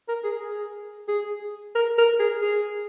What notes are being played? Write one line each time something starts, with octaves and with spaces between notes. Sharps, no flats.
A#4
G#4
G#4
G#4
A#4
A#4
G#4
G#4